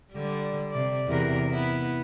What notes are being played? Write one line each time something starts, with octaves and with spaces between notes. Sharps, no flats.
D3 G3
C3 D5
E2 C3 A#4
B3 E4